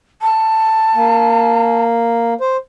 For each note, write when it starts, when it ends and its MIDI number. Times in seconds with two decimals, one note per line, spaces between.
0.22 1.83 81
0.95 2.34 58
2.41 2.57 72